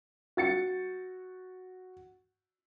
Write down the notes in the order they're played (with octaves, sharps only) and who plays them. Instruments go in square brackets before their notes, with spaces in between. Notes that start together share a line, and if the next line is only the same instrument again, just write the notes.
[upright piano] F#4 A6 C#7